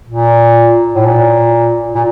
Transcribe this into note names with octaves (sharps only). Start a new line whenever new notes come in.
A#2
A2
A#2
A#2